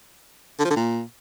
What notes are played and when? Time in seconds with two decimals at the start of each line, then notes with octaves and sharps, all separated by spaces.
0.59 D3
0.65 F3
0.70 D3
0.76 A#2